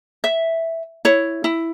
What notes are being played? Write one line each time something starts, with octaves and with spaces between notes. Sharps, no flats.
E5
E4 C#5
E4